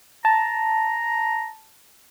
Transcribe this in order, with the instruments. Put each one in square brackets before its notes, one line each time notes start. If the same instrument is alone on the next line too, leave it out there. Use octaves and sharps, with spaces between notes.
[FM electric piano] A5 [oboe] A#5